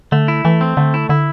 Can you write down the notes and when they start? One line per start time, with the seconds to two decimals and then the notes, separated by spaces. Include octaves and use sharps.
0.12 D3 A3
0.28 E4
0.45 E3 A3
0.61 C4
0.77 D3 A3
0.94 E4
1.09 D3 E4